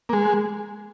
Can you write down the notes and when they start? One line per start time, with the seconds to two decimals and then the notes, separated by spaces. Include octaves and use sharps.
0.09 A#3
0.13 G#3